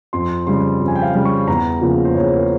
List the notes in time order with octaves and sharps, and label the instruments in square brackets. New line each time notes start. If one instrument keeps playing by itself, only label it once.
[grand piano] F2 C6
C#3 G3 C6
F2
G#5
G5
F5
C#3 G3
C#6
E2 A#5
C#3 F3 A#3
C5
E2 C#5
A#4